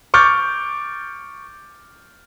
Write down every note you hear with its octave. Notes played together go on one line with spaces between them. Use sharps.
C#6 D6 F6 G6 A6